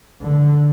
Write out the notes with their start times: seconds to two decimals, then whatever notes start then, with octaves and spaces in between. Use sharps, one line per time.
0.21 D3